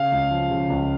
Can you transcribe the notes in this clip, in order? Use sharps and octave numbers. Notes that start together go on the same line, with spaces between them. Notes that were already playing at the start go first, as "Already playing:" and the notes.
Already playing: C#3 F5
C#2
F3
C#3
C#2